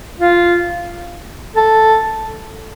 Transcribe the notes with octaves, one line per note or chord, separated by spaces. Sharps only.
F4
A4